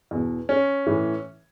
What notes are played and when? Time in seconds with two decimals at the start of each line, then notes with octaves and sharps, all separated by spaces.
0.11 E2 B2
0.49 C#4
0.87 A2 E3